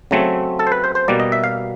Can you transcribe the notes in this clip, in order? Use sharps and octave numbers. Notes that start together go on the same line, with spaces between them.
C#3 F#3 A3 C4
A4
C5
B4
C5
C5
B2 G3 A#3 D5
D#5
E5
F5